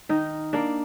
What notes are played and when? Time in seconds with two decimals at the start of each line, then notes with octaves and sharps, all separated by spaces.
0.09 D#3 D#4
0.53 A#3 D4